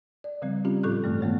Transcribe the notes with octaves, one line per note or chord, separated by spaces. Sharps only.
D5
C#3 F3 G3 C4
G3 C4 C#4 F4 G4
A2 F3 F4 A4 C#6 F#6
G2 E3 A3
D#3 G#3 A3 B3